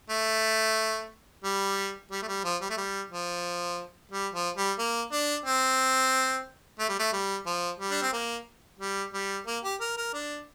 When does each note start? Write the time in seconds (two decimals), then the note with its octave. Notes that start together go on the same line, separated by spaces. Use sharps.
0.10 A3
1.44 G3
2.11 G3
2.22 A3
2.28 G3
2.44 F3
2.61 G3
2.70 A3
2.77 G3
3.11 F3
4.11 G3
4.34 F3
4.56 G3
4.79 A#3
5.12 D4
5.46 C4
6.79 A3
6.89 G3
6.99 A3
7.13 G3
7.46 F3
7.80 G3
7.91 D4
8.02 C4
8.13 A#3
8.79 G3
9.13 G3
9.47 A#3
9.64 G4
9.80 A#4
9.97 A#4
10.14 D4